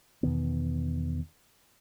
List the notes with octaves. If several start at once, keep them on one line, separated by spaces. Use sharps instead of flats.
E2 B2 D#3 B3